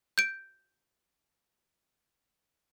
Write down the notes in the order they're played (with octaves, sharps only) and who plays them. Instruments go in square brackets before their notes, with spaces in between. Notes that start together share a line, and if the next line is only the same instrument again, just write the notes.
[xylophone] G6 D7